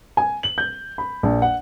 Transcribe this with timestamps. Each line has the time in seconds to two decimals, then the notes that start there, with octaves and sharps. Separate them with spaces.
0.17 G#5
0.43 F#7
0.58 G6
0.98 B5
1.23 A#1
1.42 F#5